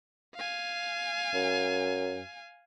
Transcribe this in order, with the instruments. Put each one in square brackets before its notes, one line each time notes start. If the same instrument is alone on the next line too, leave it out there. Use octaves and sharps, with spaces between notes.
[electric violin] F5 G#5
[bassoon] F#2